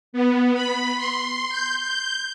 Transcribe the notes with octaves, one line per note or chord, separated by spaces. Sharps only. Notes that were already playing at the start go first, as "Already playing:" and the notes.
B3
B5
C6
G6
G6